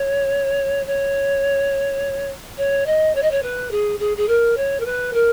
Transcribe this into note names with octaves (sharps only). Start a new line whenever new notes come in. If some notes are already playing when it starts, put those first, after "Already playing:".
Already playing: C#5
C#5
C#5
D#5
C#5
D#5
C#5
B4
G#4
G#4
G#4
A#4
C#5
A#4
B4
A#4